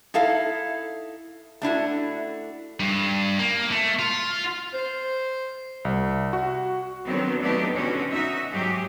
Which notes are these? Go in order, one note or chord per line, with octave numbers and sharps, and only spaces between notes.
D#4 E4 A4 F5
A3 D4 E4 F#4
G2
A#3
A3
F4
C5
C2
F#4
D3 D#3 F#3 B3 C4
F#3 A3 B3 D4 D#4 G4
B2 D3 C4 C#4 F#4
D#4 F#4 E5
G#2 F#3 G4 G#4